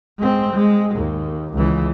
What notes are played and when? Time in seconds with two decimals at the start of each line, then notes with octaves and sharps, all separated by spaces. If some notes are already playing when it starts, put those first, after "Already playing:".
0.18 G#3 C4
0.53 G#3
0.95 D#2
1.54 C#2 E3